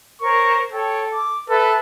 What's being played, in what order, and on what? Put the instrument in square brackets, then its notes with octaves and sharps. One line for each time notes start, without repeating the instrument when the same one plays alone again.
[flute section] A#4 C5 C#5 [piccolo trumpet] C#6
[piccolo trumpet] A4 [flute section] C#5 G5
[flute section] D6
[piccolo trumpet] A4 [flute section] B4 E5